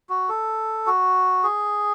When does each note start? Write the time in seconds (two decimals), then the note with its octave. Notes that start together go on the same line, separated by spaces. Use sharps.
0.09 F#4
0.29 A4
0.87 F#4
1.44 G#4